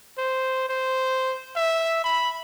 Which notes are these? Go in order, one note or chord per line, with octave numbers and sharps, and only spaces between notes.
C5
C5
E5
B5